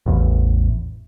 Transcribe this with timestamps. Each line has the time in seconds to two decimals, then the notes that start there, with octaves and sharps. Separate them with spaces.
0.06 A1 E2